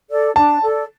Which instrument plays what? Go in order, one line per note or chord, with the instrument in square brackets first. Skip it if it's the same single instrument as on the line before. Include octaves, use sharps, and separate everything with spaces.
[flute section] A4 D5
[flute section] D4 [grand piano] A5
[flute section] A4 D5